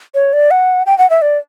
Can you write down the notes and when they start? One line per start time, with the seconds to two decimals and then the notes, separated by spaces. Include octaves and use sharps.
0.15 C#5
0.33 D5
0.51 F#5
0.86 G5
0.98 F#5
1.10 E5
1.22 D5